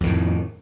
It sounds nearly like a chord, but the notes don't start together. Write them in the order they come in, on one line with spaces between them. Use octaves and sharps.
F2 D#3 A2